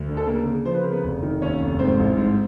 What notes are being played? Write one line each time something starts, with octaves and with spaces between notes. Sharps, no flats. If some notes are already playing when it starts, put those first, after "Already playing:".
Already playing: D2
D3
A4
C#3 A#3 A#4
C#3
F3 C5
B4
C#3 A#4
B3 B4
F1
D#3
D#2 C#4 C#5
F1
G#2 C4 C5
A1
G#2